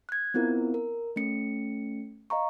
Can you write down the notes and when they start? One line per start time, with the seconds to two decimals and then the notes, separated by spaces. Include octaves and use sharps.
0.09 F#6 G#6
0.34 B3 C4 E4 F4 A#4
0.74 A#4
1.16 A3 C#4 C#7
2.30 D#5 F5 A#5 C#6